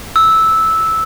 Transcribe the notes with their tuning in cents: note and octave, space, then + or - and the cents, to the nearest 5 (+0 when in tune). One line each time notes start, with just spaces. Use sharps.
E6 -10